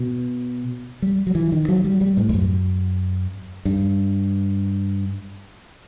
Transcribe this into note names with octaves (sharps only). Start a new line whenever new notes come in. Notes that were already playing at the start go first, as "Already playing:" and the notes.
Already playing: B2
G3
F#3
E3
D#3
F#3
G3
G3
A2
E2
F#2
G2